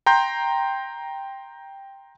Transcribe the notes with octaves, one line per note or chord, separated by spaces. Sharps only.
G5 A#5 C6 G6